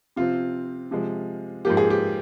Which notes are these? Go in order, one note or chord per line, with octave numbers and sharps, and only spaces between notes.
C3 F3 C4 F4
C3 F3 G#3
G#2 F3 A#3 G4
G#4
G4